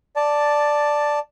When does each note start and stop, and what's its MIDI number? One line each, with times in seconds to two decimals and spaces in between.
0.16 1.19 74
0.16 1.19 81